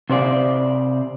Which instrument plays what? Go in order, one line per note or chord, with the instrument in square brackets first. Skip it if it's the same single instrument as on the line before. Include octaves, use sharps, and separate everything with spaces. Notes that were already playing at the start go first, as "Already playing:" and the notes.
[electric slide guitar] C3 C5 D5 F5